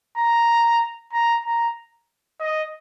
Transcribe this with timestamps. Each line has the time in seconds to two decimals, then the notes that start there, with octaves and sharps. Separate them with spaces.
0.17 A#5
1.12 A#5
1.45 A#5
2.40 D#5